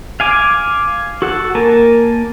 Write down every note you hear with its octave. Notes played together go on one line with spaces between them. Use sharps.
F5 G#5 D6
F#4 A4 F#5
A#3 A#4 G#5 A5